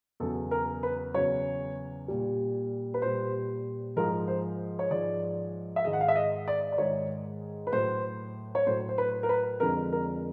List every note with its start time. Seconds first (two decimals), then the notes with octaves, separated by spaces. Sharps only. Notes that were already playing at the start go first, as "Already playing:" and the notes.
0.20 E2 C#3 F#3 A4
0.51 A#4
0.83 B4
1.14 E2 C#3 F#3 C#5
2.08 A#2 G3
2.94 B4
3.02 A#2 G3 C5
3.96 G#2 F3 G#3 A#4
4.28 C5
4.79 C#5
4.90 G#2 F3 G#3 D5
5.76 E5
5.84 G#2 D#3 G#3 D#5
5.93 F#5
6.01 F5
6.08 E5
6.16 D#5
6.48 D5
6.72 D5
6.78 G#2 D#3 G#3 C#5
7.67 B4
7.72 A2 F#3 C5
8.55 C#5
8.66 A2 F#3 C5
8.89 C5
8.98 B4
9.23 A#4
9.29 B4
9.60 F2 D3 F3 G#3 A#4
9.92 A#4